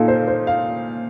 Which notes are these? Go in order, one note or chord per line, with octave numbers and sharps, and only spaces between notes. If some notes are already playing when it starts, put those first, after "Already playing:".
Already playing: A#2 D#4 F4 A4
C5
C5
F5